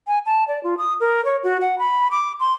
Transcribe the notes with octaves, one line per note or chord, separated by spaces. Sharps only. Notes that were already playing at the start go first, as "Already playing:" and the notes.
G#5
A5
D5
F4
D#6
A#4
C#5
F#4
F#5
B5
D6
C6